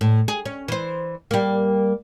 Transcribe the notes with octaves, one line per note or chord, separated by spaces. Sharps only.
A2
G#4
C#4
E3 C5
G3 A#3